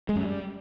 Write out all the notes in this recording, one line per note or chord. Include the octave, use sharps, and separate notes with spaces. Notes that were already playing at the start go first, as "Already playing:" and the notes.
G#3
F#2
G3